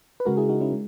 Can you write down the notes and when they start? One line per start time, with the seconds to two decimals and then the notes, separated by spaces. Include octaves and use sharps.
0.20 B4
0.25 C#3 G#3 F#4 A#4
0.37 E4 G#4
0.49 D#4 F#4
0.61 C#4 E4
0.73 G#3